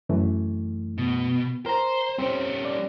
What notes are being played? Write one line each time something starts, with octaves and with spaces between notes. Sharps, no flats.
F#2 E3 A3
B2
A#4 C5 A#5
G3 C4 C#4
D5